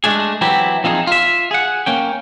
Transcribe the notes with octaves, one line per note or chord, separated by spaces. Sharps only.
G#3 A3 D4 G#4
E3 F#3 C4 E4 G4
F3 C4 D#4 F4 G#4
F4 E5
G#4 F#5
A#3 C#4 G5